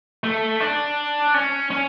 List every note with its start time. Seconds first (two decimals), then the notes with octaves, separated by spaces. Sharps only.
0.24 A3
0.60 D4
1.34 C#4
1.71 C#4